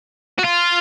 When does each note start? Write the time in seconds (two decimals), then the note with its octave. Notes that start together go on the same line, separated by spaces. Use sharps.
0.39 F#4
0.44 F4